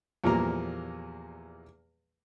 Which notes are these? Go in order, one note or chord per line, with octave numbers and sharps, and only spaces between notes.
E2 A#2 F3 G3 A#3 A#5